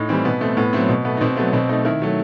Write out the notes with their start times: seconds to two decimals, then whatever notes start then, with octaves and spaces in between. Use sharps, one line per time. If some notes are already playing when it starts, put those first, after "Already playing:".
Already playing: A2 D#4
0.09 E3 G3 C4
0.25 B2 B3
0.41 A3 C4
0.57 A2 B3
0.73 F#3 A3 C4
0.89 B2
1.05 A3 B3
1.17 D#4
1.21 B2 C4
1.37 F#3 A3 B3
1.53 B2 C4
1.69 A3 D#4
1.85 D#3 E4
2.02 F#3 A3